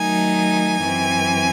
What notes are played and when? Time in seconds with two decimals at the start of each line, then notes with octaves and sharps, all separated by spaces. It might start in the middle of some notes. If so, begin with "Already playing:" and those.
Already playing: D#3 F#3 A3 D#4 G#5
0.83 F#2 E3 C4